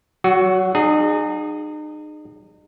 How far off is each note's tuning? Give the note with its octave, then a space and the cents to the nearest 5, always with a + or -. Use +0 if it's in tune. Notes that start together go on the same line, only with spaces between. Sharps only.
F#3 +30 F#4 +0
D#4 -40 G#4 +0